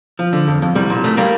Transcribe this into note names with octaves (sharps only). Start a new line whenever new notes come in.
F3
D3
F2
F2
C2 G3
A#2
C2 A3
G3 A#3